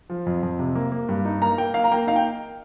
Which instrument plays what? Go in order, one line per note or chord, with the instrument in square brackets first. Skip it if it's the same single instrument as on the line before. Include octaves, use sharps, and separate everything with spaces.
[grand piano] F3
F2
F2
C3
A#3
A#3
G2
D#4
A#3 A#5
A#3 G5
A#3 F5
A#5
A#3 G5
D#4 F5
G5